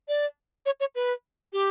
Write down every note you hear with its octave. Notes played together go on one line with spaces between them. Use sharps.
D5
C#5
C#5
B4
G4